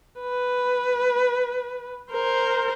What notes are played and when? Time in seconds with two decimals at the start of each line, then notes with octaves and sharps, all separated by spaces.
0.20 B4
2.12 A#4 C5